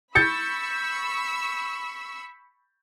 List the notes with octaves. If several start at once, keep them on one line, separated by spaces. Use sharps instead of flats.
B5 C#6 E6 G6 A6 C#7